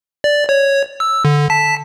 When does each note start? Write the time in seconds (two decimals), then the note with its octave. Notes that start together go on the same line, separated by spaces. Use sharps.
0.24 D5
0.49 C#5
1.00 E6
1.25 D3
1.50 A5 B6